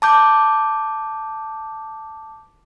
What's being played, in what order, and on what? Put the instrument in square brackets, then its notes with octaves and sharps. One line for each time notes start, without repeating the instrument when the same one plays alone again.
[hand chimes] A5 D6 G6